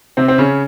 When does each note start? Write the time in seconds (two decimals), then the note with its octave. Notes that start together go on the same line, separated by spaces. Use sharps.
0.17 C3 C4
0.28 C4
0.38 C#3 C#4